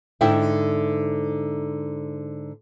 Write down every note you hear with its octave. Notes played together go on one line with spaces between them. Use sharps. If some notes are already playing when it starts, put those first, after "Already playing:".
G#2 D3 D#4 E4 G5